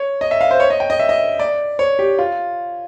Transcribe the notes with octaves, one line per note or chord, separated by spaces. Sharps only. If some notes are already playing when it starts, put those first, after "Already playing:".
Already playing: C#5
D#5
E5
F5
C5
C#5
D#5
G5
D#5
E5
D#5
D5
C#5
G4
F4